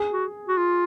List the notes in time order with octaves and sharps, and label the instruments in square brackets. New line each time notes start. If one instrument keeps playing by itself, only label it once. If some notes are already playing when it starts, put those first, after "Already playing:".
Already playing: [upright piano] G#4
[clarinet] F#4
F#4
F4